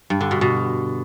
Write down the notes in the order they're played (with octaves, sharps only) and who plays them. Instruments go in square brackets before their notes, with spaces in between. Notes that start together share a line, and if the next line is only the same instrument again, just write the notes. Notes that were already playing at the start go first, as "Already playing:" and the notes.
[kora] G2
D3
B2
B2